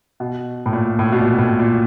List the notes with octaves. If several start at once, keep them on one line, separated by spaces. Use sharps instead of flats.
B2
A2
A#2
A2
B2
A#2
A2
A#2